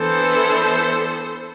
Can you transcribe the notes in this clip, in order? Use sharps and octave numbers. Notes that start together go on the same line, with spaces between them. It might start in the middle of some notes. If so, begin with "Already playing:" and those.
Already playing: E3 B3 D4 A4 C5